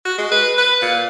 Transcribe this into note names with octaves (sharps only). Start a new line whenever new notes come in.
F#4
G#3
B4
B4
A#2